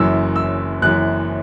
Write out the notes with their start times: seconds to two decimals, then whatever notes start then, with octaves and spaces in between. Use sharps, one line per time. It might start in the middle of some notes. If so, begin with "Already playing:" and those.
Already playing: F#1 F#2 E3 E6
0.36 E6
0.82 F#1 F#2 E3 F#6